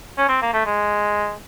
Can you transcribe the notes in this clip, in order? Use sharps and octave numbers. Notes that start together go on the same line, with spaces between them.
C#4
C4
A#3
A3
G#3